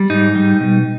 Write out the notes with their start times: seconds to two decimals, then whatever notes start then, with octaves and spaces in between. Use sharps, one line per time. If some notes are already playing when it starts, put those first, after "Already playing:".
Already playing: G3
0.10 G#2 D#4
0.35 G3
0.60 B2